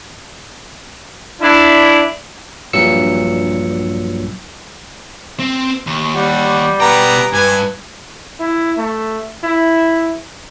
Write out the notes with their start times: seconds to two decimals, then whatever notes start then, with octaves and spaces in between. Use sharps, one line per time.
1.42 D4 E4
2.73 A#1 G2 A#2 F#3 E6 C#7
5.39 C4
5.87 D#2
6.16 G3 F#5
6.80 B2 B3 G5 A#5
7.33 G2 B4 G#5
8.40 E4
8.78 A3
9.44 E4